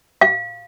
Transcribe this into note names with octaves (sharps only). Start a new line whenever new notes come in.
F5